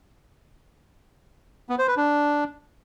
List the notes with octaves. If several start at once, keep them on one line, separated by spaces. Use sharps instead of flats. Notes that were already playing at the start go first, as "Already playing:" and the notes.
B3
C5
B4
D4